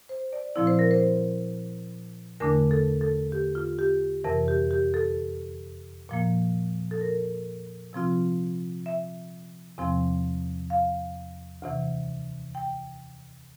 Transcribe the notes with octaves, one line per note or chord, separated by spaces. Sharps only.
C5
D5
A#2 F3 C4 E4 D5
C5
A#4
C5
E2 D3 A3 D4 A#4
A4
A4
G4
F4
G4
F2 C3 E3 A#4
G4
G4
A4
A#2 F3 A#3
A4
A#4
C3 F3 C4 F4
E5
E2 C3 F3 C4
F5
D2 C3 E3
G5